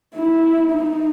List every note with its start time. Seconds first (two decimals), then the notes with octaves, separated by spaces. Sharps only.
0.15 E4
0.71 D#4